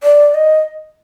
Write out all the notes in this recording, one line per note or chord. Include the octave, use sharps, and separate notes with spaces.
D5
D#5